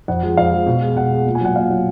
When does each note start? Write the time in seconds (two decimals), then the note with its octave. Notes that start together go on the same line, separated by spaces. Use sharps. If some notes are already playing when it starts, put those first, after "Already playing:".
0.08 F2 F#5
0.23 F3 G#3
0.37 F2 F5
0.52 F3 G#3
0.66 B2
0.82 G#3
0.96 B2 F#5
1.11 G#3
1.26 A#2
1.35 G#5
1.41 F#3 F#5
1.56 A#2 F5
1.70 F#3